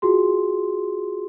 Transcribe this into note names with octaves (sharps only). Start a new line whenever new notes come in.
F4 F#4 G#4 C6